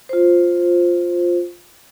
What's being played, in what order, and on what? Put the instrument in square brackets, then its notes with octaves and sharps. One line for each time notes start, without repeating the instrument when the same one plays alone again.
[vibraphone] F4 C5